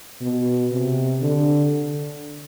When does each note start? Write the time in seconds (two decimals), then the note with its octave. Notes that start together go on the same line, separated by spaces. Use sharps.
0.22 B2
0.72 C3
1.22 D3